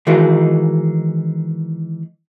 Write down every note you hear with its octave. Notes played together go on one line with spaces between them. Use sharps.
D#3 E3 G#3 D#4 F#4 A#4